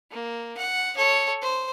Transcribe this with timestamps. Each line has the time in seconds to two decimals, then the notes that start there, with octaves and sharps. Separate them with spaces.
0.11 A#3
0.57 F#5
0.96 A4 C#5
1.41 C5